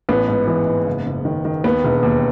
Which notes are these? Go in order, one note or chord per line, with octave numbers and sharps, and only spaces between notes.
A1 B3
G#2
E3
G#2
F#1
F#1
D#3
D#3
D#2 B3
E1
D#2